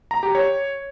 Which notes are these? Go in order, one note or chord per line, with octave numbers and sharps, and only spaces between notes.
A#5
G4
C#5